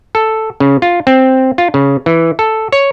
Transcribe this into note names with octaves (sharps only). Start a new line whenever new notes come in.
A4
C#3
F4
C4
F4
C#3
E3
A4
C#5